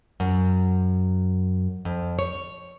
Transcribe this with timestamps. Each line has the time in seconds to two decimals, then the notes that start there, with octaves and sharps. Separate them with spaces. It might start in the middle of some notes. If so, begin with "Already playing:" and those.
0.20 F#2
1.85 F2
2.19 C#5